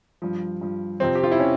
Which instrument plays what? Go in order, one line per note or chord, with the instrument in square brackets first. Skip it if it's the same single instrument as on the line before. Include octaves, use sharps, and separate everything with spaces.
[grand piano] G2 F3
G2 F3
F2 C3 F3 C4
G4
F4
E4
C3 C#4